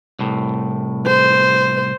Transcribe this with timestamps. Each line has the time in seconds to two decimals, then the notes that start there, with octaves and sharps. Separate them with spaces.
0.19 C2 A2
1.07 C5